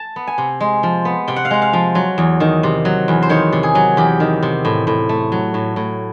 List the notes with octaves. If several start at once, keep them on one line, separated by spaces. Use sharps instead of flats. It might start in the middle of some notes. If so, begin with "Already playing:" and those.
Already playing: A5
B3
G#5
C3
G#3
F3
B3
C3 G5
F#5
F5
G#3 F#5
F5
F3
F#3
E2
D#3
C3
F#3
E2
C5
D#3 C#5
C3
G#4
F#3
E2 G4
D#3
C3
A2
A2
A3
F#3
A2
A2